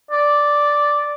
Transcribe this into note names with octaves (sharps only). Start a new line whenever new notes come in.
D5